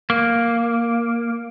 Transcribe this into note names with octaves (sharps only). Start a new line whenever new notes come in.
A#3